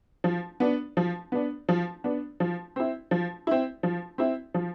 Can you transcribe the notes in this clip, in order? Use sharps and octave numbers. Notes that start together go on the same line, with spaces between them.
F3
B3 D4
F3
B3 D4
F3
B3 D4
F3
C4 E4
F3
C4 E4
F3
C4 E4
F3